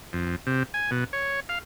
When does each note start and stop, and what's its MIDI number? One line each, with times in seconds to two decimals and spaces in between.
0.13 0.36 41
0.47 0.63 48
0.74 0.91 80
0.91 1.04 47
1.13 1.40 73
1.49 1.59 77